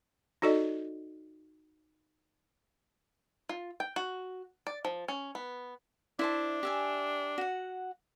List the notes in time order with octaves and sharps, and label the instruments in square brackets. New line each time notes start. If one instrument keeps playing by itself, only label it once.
[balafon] D#4 F#4 A4 D5 D#5
[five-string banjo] F4
G5
F#4
D5
F3
C#4
B3
[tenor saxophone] D4 [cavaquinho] E4 C5 A5
[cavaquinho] G4 E5 G#5
F#4 F#5